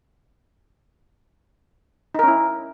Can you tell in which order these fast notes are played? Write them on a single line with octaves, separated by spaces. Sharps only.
D#4 A#4 C#4 E4